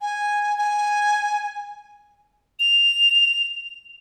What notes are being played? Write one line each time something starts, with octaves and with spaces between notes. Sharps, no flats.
G#5
G#5
F7